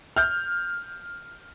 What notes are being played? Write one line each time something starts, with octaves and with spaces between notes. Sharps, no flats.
F6 G6